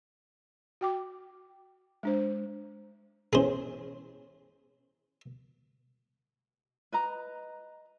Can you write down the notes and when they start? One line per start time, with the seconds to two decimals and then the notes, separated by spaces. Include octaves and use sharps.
0.81 F#4 G5 D6
2.03 G#3 D4 C5
3.33 B2 E3 C#4 G#4 C5
6.92 B4 D#5 A#5